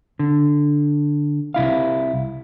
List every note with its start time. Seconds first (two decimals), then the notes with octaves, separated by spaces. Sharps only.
0.19 D3
1.54 C2 E4 F5